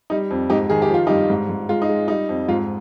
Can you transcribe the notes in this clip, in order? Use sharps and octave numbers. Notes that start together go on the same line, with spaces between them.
G3 D#4
F2
G#2 D#4 G4
D#3 G#4
G4
F3 F4
G2 D#4 G4
G#2
G#2
G#3 F4
D#4
G#3
G3 D#4
F2
G#2 F4